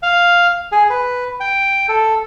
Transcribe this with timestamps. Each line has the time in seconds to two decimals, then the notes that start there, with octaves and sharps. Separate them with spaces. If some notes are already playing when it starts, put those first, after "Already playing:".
0.03 F5
0.72 G#4
0.90 B4
1.40 G5
1.88 A4